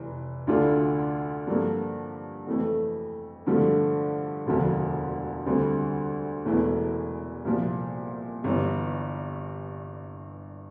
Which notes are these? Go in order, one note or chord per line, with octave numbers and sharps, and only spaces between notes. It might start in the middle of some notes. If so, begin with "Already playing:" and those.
Already playing: F1 E3
D2 D3 A3 D4 F4
G2 F3 A#3 D4 A4
F2 E3 A3
G2 D3 F3 A3
E1 D2 D3 F3
D2 D3 G3 C4
E1 E2 E3 A3 E4
C2 A#2 F3
G1 G2 E3